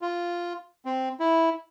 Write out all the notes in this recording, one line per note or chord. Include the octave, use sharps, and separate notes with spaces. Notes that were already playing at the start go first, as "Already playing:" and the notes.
F4
C4
E4